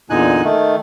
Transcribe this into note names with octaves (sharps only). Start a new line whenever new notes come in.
E2 A#2 D3 D#4 G#5 F#6
D#3 A3